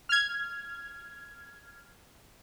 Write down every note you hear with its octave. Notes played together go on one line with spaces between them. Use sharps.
F6 G#6